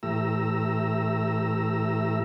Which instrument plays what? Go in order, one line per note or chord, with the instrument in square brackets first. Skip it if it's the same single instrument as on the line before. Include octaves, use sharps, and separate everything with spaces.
[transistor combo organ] A2 E3 A3 G4 A#5 E6